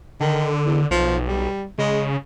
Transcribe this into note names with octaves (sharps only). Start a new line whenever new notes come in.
D3 D#3
E2
B1 F3
G3
C#3 G#3